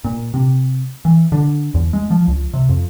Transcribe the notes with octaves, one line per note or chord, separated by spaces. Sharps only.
A#2
C3
E3
D3
E2
G#3
F3
C#2
C3
F2